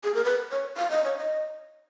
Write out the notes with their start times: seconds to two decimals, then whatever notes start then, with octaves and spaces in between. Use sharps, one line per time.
0.04 G#4
0.14 A#4
0.25 B4
0.51 C#5
0.77 F5
0.90 D#5
1.04 C#5
1.17 D#5